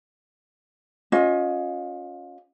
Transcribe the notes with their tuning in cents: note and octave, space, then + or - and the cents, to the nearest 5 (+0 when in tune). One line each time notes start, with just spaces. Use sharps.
C#4 +0 F4 +30 D#5 +0